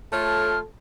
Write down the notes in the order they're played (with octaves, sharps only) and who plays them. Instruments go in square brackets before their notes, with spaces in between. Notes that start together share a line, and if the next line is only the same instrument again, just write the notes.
[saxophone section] A3 F4 C#5 [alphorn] A4 [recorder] F6